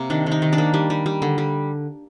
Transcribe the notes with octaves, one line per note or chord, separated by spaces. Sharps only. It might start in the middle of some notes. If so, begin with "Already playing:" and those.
Already playing: C3 A#3
D#3 D4
D#3
D#4
D#3
D4 D5
A#3
G3
G3
G3
D3
G3